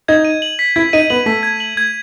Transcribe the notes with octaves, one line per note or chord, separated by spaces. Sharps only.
D#4 G#6
D#7
F#7
B6
E4 G#6
D#4 D#7
B3 F#7
A3 B6
G#6
F#7
G#6